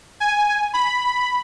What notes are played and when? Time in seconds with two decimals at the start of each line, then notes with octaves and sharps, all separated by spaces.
0.20 G#5
0.73 B5